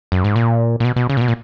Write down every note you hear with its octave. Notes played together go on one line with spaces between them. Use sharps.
F#2
G#2
A#2
A#2
B2
B2
C#3
A#2
B2
A#2